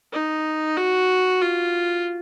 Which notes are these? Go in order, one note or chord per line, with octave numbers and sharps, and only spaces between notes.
D#4
F#4
F4